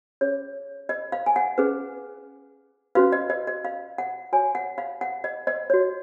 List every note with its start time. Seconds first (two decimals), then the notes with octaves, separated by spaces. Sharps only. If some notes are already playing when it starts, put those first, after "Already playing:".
0.21 C#4 G#4 C#5
0.89 D#5
1.12 F5
1.26 G#5
1.36 F#5
1.58 C#4 G#4 B4
2.95 C#4 F#4 B4 F5
3.12 D#5
3.30 D#5
3.47 D#5
3.65 F5
3.98 F#5
4.33 F#4 C#5 G#5
4.55 F#5
4.78 F5
5.01 F#5
5.24 D#5
5.47 D#5
5.70 F#4 C#5